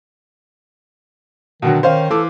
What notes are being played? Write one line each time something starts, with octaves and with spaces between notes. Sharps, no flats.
B2 D3 D#3 F#3
D#3 C#4 C5 F5
E3 A4 D6